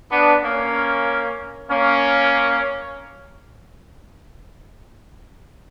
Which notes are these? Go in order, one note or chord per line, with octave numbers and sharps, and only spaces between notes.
B3 D4
A#3 C#4
A#3 C#4